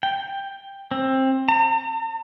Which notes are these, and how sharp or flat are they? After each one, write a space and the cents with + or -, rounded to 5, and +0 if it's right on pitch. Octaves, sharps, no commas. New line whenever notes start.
G5 +10
C4 +20
A#5 -45